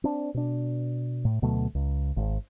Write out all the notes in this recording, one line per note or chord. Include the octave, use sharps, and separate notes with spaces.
C4 D4
B2 D4
A2
D2 B2 F#3 A3
C#2
G#1